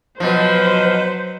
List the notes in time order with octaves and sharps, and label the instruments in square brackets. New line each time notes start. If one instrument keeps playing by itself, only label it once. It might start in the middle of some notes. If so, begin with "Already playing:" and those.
[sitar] B2 F3 [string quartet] F#3 B4 [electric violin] C5